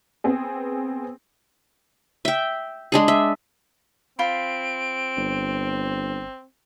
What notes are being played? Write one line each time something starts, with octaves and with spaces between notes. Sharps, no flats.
B3 C4 G#4
E5 G5
G#3 D4 G#4
E5
C4 F4 B5 D7
G1